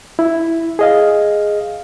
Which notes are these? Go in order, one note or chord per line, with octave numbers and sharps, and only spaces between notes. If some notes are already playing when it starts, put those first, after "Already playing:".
E4
G#4 D#5 F5